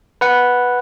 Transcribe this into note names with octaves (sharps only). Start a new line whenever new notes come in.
B4 F#5